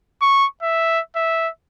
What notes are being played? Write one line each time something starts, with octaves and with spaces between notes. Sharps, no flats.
C#6
E5
E5